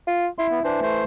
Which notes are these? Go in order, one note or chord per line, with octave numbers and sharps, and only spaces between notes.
F4
E4 C6
B3
E3 D4 C5
A3 C5